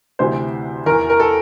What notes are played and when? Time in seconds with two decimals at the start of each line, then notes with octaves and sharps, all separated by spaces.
0.19 D2 C3 E3 C5
0.86 E2 E3 A#4
1.10 A#4
1.20 A4